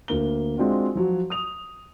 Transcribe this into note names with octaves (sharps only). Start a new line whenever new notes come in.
D2 A#3 G7
G#3 C4 D4 F4 F#4
F3 F#3
D#6 F7